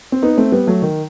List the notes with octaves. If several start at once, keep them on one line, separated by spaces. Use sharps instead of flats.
C4
B3 D#4
A3 C4
G3 B3
F#3 A3
D#3